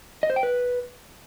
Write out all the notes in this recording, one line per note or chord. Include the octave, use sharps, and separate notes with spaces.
D#5
C5
G5
B4